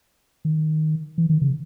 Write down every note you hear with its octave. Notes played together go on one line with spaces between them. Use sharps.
D#3
E3
D#3
C#3